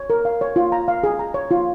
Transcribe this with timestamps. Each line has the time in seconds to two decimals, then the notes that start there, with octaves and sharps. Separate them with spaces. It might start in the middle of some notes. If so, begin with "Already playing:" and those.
Already playing: C#5
0.10 A#4
0.25 F5
0.41 C#5
0.56 F4
0.72 A#5
0.88 F5
1.04 G#4
1.19 A#5
1.34 C#5
1.51 F4